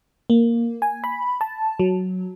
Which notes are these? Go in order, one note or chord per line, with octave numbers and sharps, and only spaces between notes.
A#3
G#5
B5
A5
F#3